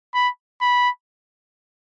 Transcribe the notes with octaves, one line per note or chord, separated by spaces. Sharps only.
B5
B5